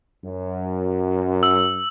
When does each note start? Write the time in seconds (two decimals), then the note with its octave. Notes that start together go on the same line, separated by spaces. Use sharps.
0.23 F#2
1.43 E6